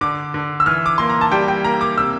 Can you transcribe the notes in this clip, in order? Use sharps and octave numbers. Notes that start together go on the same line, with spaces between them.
D3 D6
D3
E6
E3 F6
D6
A#3 C6
A#5
A5
G3 G5
G5
A#3 A#5
D6
C3 E6